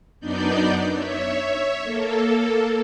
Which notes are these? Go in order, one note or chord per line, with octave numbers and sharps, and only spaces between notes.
F#2 B3 D4 D#4 D5 G6
C#5 E5
A#3 A4